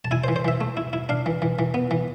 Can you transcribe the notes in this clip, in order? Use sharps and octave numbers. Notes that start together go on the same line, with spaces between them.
A5
E4 G#5
C5
E3
C5
E3 E5
A3
E4
E4
D4 F5
E3
E3
E3
B3
E3